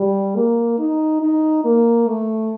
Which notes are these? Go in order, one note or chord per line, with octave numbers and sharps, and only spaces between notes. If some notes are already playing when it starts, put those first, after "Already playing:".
Already playing: G3
A#3
D#4
D#4
A#3
A3